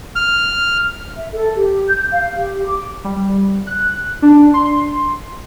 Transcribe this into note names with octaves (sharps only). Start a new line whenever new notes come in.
F6
E5
A4
G4
G6
F5
G4
D6
G3
F#6
D4
C6